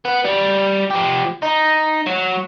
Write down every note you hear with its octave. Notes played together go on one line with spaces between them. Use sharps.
B3
G3
F3 G4
D#4
F#3